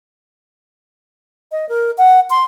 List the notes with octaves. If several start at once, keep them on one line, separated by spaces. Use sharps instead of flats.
D#5
A#4
F#5
C6